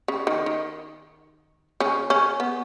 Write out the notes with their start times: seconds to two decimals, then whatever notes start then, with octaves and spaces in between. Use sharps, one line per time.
0.08 C#3
0.27 D#3
0.46 D#3
1.80 C#3 C#4
2.10 C#3 C#4
2.40 B3